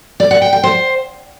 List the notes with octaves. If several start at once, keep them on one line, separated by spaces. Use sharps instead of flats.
D5
F#5
G5
G5
C5